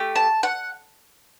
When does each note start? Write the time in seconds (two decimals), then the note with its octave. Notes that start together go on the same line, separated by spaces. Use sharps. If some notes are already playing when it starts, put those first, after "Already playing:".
Already playing: A3 G4
0.16 A5
0.43 F#5